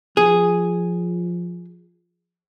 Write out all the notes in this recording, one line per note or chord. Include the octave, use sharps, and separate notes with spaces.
F3 G#4